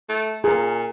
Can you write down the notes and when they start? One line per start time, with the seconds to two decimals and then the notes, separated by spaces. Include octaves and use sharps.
0.09 A3
0.44 A#2 G#4 A#4